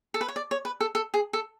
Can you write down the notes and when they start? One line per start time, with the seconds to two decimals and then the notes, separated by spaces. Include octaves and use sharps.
0.14 A4
0.21 B4
0.28 C#5
0.36 D5
0.51 C#5
0.65 B4
0.80 A4
0.95 A4
1.14 G#4
1.33 A4